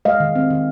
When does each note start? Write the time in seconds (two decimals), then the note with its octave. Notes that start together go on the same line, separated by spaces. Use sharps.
0.05 G#3 D#5 F5
0.20 D#3
0.36 C4
0.50 D#3